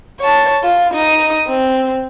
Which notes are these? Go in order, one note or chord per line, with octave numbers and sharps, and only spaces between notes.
C#5 A5
F4
D#4 D#6
C4